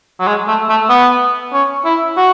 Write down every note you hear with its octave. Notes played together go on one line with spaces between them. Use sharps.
F#3
G#3
A3
A3
B3
C#4
E4
F#4